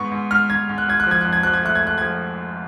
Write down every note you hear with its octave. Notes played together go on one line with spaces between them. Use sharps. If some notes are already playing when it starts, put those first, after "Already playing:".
Already playing: G#2 B3 C#6
G#2
G#2 F6
G#2 G#6
G#2
F#6
G#2 G#6
F#6
F3 G#6
F2 F#6
G#6
F3 F#6
G#6
A3 F#6
G#6
A3 F#6
F3 G#6